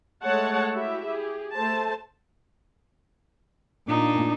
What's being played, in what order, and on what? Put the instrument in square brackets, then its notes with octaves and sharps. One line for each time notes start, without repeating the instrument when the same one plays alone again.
[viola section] G#3 A3 C#5 F#5 A5
E4 F#4 G4 E5
G4 G#4
A3 C5 A5
[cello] A#2 [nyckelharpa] D4 D#4